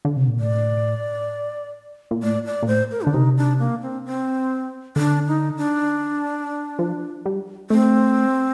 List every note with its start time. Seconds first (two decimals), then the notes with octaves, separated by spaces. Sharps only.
0.05 D3
0.17 C3
0.28 A#2
0.40 A2 D5
2.11 A#2
2.23 A2 D5
2.46 D5
2.63 A#2
2.67 A2 C5
2.91 A#4
3.02 D3 D4
3.14 C3 D#4
3.37 D4
3.59 A#3
3.82 C4
4.06 C4
4.96 D3 D4
5.28 D#4
5.57 D4
6.79 F3
7.26 G3
7.70 A3 C4